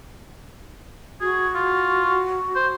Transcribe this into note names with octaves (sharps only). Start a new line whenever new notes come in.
F#4 G#4
F4
C5